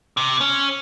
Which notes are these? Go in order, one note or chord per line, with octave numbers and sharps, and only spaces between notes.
C3
C#4